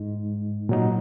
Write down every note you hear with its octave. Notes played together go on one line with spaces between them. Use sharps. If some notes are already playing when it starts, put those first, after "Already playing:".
Already playing: G#2 G#3 D#4
A#2 F#3 D#4